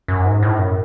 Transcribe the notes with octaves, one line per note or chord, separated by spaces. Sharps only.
F#2
G#2
A2
F#2